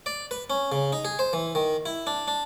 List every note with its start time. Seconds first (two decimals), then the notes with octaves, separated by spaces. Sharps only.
0.06 D5
0.31 B4
0.50 C#4
0.72 C#3
0.93 D#4
1.05 G#4
1.19 C5
1.33 E3
1.55 D#3
1.86 E4
2.07 D4
2.28 D4